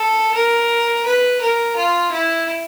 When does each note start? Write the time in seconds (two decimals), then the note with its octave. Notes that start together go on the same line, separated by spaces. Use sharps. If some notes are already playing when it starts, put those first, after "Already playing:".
Already playing: A4
0.35 A#4
1.06 B4
1.41 A#4
1.76 F4
2.12 E4